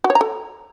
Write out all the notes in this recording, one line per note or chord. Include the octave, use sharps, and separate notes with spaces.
F#4
C#5
A#5
A4